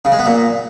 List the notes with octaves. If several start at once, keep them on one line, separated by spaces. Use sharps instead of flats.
C#3
G#3
B3
A#2